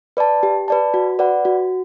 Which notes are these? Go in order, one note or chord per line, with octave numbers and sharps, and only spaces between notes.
B4 D5 A5
G4
B4 D5 A5
F#4
B4 D5 F#5
F#4